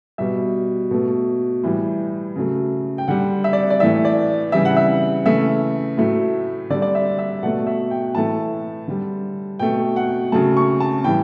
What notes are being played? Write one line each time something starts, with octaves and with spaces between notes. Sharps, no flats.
B2 G3 E5
B2 A3
A2 E3 G3
C#3 F#3 A3
G5
D3 G3 F#5
E5
D5
D5
A2 E3 A3 E5
D5
C#3 E3 G3 E5
F#5
E5
C#3 E3 A3 E5
A2 F#3 A3
D3 G3 D5
D5
E5
E5
B2 A3 F#5
E5
G5
A2 E3 A3 A5
D3 G3
B2 A3 G5
F#5
C#3 F#3 A3 A5
C#6
A5
A2 E3 G3 G5